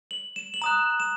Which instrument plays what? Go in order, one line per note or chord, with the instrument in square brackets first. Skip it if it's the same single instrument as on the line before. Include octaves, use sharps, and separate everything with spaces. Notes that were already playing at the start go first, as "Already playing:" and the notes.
[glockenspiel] F#7
E7
F#7
A#5 D#6 F#6 E7
E7